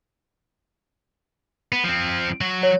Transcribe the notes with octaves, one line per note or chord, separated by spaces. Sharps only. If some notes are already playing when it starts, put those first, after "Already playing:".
B3
F3 C4
F#3 F#4
C#5